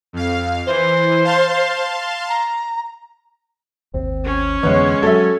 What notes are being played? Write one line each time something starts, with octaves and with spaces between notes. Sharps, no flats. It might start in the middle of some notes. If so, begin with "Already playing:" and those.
F2 F5
E3 C5
F5 A5 C6
A#5
G#1 D#2 C4
C#4
F2 D3 E3 G#3 B3 C#5
F#3 G#3 F#4 A4 E5